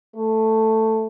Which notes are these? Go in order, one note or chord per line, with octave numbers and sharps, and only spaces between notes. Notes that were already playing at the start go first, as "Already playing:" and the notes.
A3